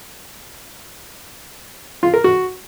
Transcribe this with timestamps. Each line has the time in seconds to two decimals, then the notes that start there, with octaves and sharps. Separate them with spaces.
2.03 F4
2.14 A#4
2.24 F#4